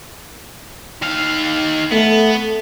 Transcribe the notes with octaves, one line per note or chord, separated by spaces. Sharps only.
D#3 F5
A3 B3